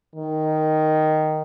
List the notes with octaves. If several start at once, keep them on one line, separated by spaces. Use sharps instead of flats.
D#3